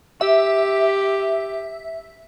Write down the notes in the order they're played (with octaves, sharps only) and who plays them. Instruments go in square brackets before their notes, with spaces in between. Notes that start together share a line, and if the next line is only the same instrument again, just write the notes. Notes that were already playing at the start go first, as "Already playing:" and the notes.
[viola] G4 [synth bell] E5